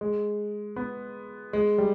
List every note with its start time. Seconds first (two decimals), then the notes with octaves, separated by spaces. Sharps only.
0.01 G#3
0.76 B3
1.53 G#3
1.78 G3